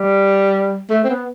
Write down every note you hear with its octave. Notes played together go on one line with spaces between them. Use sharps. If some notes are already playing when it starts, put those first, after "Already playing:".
Already playing: G3
A3
C4
B3